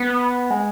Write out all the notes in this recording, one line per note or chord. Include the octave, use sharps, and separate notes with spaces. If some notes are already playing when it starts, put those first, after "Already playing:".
Already playing: B3
G#3